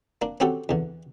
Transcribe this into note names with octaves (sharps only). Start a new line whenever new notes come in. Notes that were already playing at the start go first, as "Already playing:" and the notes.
A#3 D4
C4 C#4 F#4 G4 A4
E2 D3